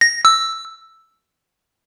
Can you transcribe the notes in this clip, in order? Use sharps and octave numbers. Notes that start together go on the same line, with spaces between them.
A#6
E6